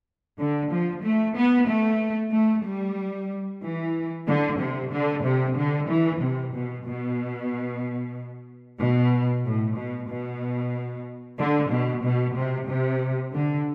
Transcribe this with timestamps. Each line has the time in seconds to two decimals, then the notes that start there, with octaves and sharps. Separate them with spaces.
0.39 D3
0.70 F3
1.03 A3
1.36 B3
1.68 A3
2.33 A3
2.64 G3
3.63 E3
4.27 D3
4.59 C3
4.92 D3
5.24 C3
5.57 D3
5.89 E3
6.21 C3
6.54 B2
6.86 B2
8.80 B2
9.45 A2
9.77 B2
10.10 B2
11.39 D3
11.72 B2
12.04 B2
12.36 C3
12.69 C3
13.34 D3